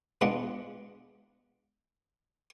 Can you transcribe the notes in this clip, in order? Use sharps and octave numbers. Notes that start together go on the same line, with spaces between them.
G#3 B3 D4 F4 D#5 F#5